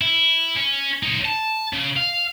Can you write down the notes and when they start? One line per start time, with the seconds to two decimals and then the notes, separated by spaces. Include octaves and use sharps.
0.01 E4
0.56 C#4
1.03 D#4 C#5
1.25 A5
1.73 C#3
1.96 F5